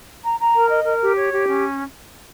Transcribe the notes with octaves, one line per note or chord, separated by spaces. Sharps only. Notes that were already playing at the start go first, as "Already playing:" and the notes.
A#5
A#5
A#4
D#5
A#4
G4
C#5
G4
C#4